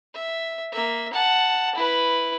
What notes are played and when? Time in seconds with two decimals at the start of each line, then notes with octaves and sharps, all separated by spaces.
0.14 E5
0.72 A#3 E5
1.13 F#5 A5
1.75 E4 B4